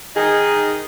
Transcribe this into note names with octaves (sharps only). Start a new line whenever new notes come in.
D#3 D#4 G#4